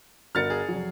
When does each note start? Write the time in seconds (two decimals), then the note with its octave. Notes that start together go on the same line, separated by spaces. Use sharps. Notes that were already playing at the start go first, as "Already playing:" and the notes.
0.35 G1 F#4 A#4 F6 A6 C#7
0.50 G#4
0.68 F1 F#3